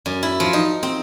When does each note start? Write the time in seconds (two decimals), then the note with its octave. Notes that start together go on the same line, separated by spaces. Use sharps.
0.06 F#2
0.23 E4
0.40 F3
0.53 D#4
0.83 C4